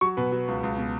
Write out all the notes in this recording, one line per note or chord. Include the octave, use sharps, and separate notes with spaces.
F#3 C#6
B2 B4
F#3
C#2
C#2
B2